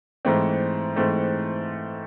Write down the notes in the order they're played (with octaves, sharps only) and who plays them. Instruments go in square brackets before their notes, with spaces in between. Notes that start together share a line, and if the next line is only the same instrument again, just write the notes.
[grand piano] G#2 E3 A3 C4
G#2 E3 A3 C4